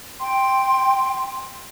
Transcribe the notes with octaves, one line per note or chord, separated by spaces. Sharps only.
G5 C6